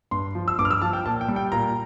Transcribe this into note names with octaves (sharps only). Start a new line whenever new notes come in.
G2 C6
F3
E6
G2 D6
F6
E6
F3 A5
G5
A#2 A5
G5
G3
G5
A#2 A#5